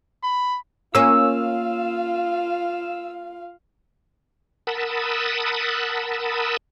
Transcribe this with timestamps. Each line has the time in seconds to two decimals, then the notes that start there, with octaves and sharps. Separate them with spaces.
0.23 B5
0.95 A#3 C#4 F4 F5 E6
4.67 A#4 F#5 A5 B5 D#6 E6